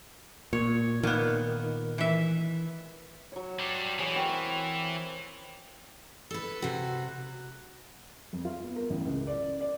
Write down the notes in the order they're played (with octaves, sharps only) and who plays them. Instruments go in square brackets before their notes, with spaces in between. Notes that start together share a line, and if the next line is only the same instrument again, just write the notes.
[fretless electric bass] A#2 [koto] C#5
[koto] A#2 B3 [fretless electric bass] D#3
[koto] E3 E5
[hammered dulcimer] F#3 C#5
[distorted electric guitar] G3 D4
[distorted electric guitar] E3 [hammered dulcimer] F#4 G#4 C#5
[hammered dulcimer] A#4 C#5 G5
C4
[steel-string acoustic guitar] A4 B4
C3 F#4
[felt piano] F2
F4
B3
A#4
A1
C#2
D5
D5